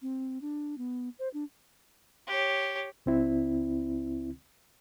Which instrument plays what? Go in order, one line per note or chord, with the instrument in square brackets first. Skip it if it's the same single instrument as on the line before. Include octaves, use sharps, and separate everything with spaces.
[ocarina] C4
D4
B3
C5
D4
[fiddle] G4 C#5
[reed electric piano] C#2 C4 E4